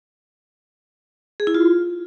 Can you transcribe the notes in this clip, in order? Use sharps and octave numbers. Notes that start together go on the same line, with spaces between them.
G#4
E4
F4